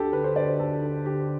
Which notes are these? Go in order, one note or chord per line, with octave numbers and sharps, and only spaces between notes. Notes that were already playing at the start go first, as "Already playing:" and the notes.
Already playing: D2 D3 G4 A4
D3 B4
C5
D2 D5
C5
D2 A4
D3
D3 G4